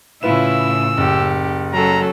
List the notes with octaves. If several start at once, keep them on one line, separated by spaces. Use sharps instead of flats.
A2 C#3 E4 F4 B4 E6 E7
F#1 G4
F#3 C#4 A4 A#5